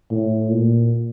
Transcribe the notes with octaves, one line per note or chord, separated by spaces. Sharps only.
A2
A#2